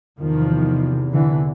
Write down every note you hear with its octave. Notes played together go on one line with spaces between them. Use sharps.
E2 C3 D#3 F3
D3 E3